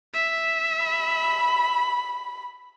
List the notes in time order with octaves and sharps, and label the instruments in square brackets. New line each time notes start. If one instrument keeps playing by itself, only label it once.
[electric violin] E5
[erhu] B5